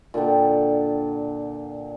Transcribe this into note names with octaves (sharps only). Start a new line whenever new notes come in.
A#2 D3 F#5 G5